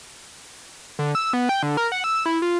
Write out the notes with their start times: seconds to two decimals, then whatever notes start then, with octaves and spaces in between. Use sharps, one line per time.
0.99 D3
1.15 E6
1.33 B3
1.49 G5
1.63 D3
1.77 A#4
1.92 F#5
2.04 E6
2.26 E4
2.42 F4